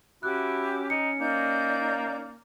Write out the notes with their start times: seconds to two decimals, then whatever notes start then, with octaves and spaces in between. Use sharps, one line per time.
0.23 C#4 E4 F#4 G4 D6 F#6
0.90 D#4 C#7
1.20 A#3 D#4 D5 G6